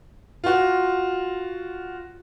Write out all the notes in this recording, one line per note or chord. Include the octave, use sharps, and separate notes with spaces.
F4 F#4